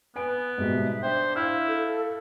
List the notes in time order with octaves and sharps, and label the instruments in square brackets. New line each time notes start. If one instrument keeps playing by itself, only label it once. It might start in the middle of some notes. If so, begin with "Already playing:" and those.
[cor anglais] B3 [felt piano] B4 G#5 D7
[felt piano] G#2 B2 G3 [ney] E5
[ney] D4 [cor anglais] C5 [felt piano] G5
[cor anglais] E4 [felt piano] F5 F6
[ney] A4